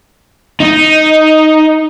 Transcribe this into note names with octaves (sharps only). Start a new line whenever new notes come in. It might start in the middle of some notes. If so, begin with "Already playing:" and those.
D#4